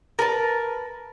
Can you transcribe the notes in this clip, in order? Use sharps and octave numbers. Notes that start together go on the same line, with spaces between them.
A#4 B4 A5